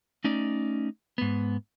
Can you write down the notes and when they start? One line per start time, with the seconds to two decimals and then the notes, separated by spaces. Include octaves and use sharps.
0.24 A3 C#4 D#4 D5
1.18 G#2 B3